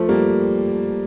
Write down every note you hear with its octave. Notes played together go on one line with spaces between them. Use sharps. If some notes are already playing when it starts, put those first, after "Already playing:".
Already playing: F3 A3
G3 A#3